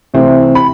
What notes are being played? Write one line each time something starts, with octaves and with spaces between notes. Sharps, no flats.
C3 E3 A3 C4 E4
B5